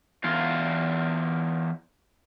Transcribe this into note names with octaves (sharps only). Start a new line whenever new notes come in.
E2 F4